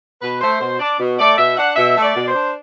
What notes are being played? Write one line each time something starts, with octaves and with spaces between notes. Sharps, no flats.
B2 B4
A3 C5
B2 C5
D4 D5
B2
A3 D5
B2 E5
D4 F#5
B2 E5
A3
D5
B2
C5
D4